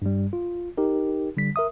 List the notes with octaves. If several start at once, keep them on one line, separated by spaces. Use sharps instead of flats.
G2 G3
F4
D#4 G4 A#4
D3 G3 B6
A#4 E5 D#6